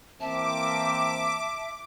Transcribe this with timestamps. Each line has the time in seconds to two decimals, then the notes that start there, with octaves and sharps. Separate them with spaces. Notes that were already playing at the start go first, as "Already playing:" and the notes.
0.21 E3 A#3 C4 E5 A5 D6